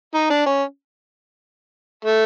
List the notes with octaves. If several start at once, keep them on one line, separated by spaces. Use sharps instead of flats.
D#4
D4
C#4
A3